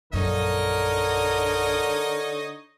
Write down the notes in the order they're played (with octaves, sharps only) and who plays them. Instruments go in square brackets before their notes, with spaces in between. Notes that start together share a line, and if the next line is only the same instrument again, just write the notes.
[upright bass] A#1 F#2 [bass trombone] D3 [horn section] D#4 C#5 D#5 [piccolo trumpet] A#4